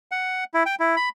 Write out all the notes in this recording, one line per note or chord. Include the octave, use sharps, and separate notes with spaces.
F#5
E4
G5
E4
B5